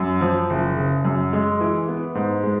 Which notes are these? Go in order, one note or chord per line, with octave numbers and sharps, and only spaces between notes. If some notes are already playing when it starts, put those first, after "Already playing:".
Already playing: F#2
F3
F#1
C#3
F#2
G#3
E3
B3
G#2
G#3